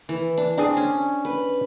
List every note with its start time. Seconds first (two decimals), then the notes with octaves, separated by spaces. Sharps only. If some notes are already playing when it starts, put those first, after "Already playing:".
0.09 E3
0.38 D4
0.58 C4 D4 G#4
0.77 C#4
1.25 B4